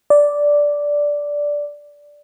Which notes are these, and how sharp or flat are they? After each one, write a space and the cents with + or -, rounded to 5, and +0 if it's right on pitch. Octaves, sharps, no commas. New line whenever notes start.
D5 -5